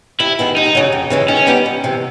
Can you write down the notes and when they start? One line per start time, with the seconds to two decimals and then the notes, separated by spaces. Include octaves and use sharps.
0.20 D#2 E4
0.39 D#3 G#3 B3
0.56 D#2 D#4
0.75 C#3 F#3
0.92 F2
1.10 C#3 E3 G#3
1.28 D#3 C#4
1.47 G3 B3 D#4 G4
1.66 F2
1.84 C3 E3